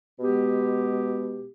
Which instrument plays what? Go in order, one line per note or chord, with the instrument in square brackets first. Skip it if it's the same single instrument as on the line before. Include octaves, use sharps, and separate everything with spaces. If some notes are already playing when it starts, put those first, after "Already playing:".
[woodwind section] B2 G#3 B3 G4